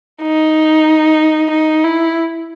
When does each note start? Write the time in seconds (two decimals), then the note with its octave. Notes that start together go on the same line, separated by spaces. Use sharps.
0.22 D#4
1.50 D#4
1.84 E4